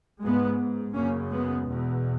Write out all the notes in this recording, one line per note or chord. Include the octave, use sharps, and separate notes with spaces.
G#2 G#3 B3
F#2 C#3 A#3 C#4
G#3 B3
E2 B2